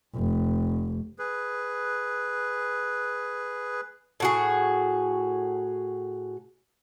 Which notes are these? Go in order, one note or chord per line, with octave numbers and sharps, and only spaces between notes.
F1
G#4 B4
A2 F#4 G#4